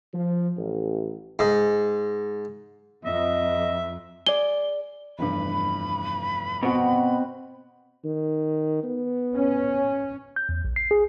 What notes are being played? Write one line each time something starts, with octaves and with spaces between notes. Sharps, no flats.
F3
A1
G#2
F2 D#5 E5
G#4 D5 G7
F1 E2 G2 B5
B2 C4 F#4
D#3
B3
C#4
G6
E2
A#1
C7
G#4